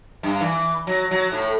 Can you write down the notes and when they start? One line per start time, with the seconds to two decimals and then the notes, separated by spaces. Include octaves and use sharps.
0.23 G2
0.41 E3
0.87 F#3
1.11 F#3
1.32 A2